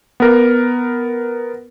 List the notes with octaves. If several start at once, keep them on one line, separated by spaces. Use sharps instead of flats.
B3 A#4